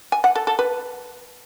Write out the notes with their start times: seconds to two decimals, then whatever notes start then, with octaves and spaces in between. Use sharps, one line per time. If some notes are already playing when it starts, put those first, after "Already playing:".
0.12 G#5
0.24 F#5
0.36 A4
0.47 A4
0.59 B4